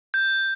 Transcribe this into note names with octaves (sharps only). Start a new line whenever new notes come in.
G6